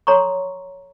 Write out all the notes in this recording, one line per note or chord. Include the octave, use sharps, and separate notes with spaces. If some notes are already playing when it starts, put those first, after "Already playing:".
A4 C#5 A#5 C6 C#6